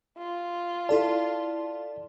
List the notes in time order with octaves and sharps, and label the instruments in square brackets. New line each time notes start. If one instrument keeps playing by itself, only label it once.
[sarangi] F4
[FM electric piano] E4 A4 A5 [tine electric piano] D5